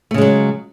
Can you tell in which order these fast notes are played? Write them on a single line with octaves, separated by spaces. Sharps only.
A3 C#3 G#3 F#3